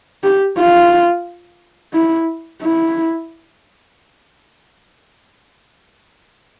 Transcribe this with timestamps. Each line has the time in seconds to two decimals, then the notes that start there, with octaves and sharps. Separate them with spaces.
0.24 G4
0.59 F4
1.94 E4
2.62 E4